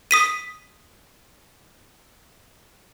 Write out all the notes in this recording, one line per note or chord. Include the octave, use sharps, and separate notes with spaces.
D#6 B6 D#7